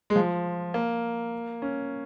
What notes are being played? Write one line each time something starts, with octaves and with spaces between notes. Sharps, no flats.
G#3
F3
A#3
C#4